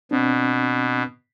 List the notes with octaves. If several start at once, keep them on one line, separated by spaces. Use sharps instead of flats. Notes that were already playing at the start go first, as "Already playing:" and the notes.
B2 C4 D4